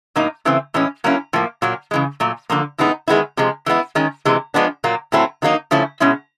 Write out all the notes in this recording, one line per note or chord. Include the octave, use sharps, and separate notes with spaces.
A2 F#3 A#3 D#4
C#3 E3 A3 C4
A2 E3 G#3 C#4
F#3 A#3 C#4 E4
A2 F3 A#3
A#2 F#3 A#3
C#3 E3 G#3
A#2 F#3 A3
D3 F3 A#3
A2 E3 G#3 B3 D#4
D#3 G#3 B3 E4
C3 F3 G#3
E3 G#3 B3 E4
D#3 G#3 C#4
C3 E3 G#3
F3 G#3 B3 D4
A#2 F#3 A#3
A2 F#3 A3 C4 E4
D#3 F#3 A#3 D#4
C#3 F3 A3 C#4 E4
B2 G#3 C#4 E4